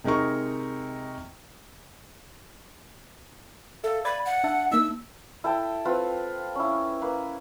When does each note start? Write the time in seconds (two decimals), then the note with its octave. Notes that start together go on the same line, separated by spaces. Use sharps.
0.04 C3 G#3 D#4 A#4 C#6
3.84 A4 E5 F5
4.05 D5 B5 G#6 A6
4.26 F#5
4.44 D4 E5 A5
4.72 A#3 D#4 E6
5.44 E4 A4 G5 A5
5.85 C4 F4 B4
6.55 C#4 E4
7.02 A#3 B4